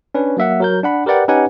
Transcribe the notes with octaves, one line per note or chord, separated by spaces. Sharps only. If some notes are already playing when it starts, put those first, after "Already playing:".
C#4 D4 B4
F#3 A#3 E5 F#5
F#3 A#4 G6
D4 F#5 B5
G4 A#4 B4 D5 F#5 G5
C#4 D#4 G4 B4 F#5 G#5